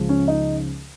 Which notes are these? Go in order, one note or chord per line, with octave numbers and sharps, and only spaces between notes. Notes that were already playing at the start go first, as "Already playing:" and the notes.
Already playing: C#2 C#3 F3
C#4
D#4